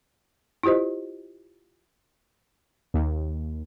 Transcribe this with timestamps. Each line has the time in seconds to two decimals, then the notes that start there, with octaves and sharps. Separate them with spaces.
0.64 E4 F4 G4 C5 D#5
2.94 D#2